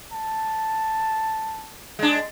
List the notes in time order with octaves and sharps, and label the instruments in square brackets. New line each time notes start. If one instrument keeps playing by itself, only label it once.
[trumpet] A5
[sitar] G#3 D4